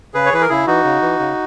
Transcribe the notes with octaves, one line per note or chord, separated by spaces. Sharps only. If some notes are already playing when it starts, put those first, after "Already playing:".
C#3 G#4 B4
C#5
E3 B4
A#4
C#3 E4 G#4
E3 D#4 F#4
C#3
E3
C#3